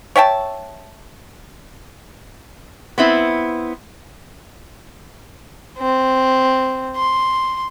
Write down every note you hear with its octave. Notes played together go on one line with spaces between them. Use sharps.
C#5 E5 G5 A5
B3 C4 E4
C4
C6